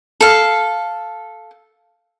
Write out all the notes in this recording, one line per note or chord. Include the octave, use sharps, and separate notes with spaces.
A4 F5